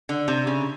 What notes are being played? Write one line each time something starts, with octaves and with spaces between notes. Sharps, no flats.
D3
C3
C#3